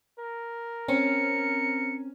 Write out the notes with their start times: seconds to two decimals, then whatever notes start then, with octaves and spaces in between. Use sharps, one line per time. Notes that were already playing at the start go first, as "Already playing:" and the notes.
0.20 A#4
0.88 C4 C#4 C#7